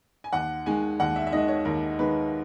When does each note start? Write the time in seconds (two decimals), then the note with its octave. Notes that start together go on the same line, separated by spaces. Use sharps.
0.24 G#5
0.32 D#2 F#5
0.66 D#3 G#3 G#5
1.00 D#2 F#5
1.16 E5
1.27 E5
1.32 D#3 G#3 D#5
1.48 C#5
1.65 D#2 A#4
1.99 D#3 G#3 B4